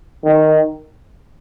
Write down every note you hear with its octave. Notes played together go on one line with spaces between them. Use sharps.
D#3